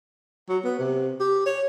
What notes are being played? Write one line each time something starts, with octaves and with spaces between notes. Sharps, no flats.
F#3
B3
C3
G4
C#5